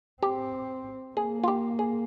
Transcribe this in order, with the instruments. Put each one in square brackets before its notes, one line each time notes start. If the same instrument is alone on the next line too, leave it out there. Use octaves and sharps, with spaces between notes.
[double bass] C4 [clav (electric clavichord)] G4
[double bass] A#3 [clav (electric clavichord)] G#4
[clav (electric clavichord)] F4
G4
G#4